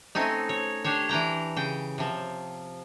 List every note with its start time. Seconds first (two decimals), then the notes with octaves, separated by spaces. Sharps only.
0.15 A3 C4 C#4 D#4
0.49 C#5
0.84 D4 G4 C5 C#5
1.09 E3 D4 G5 A#5
1.56 C#3 G5
1.98 C3 F3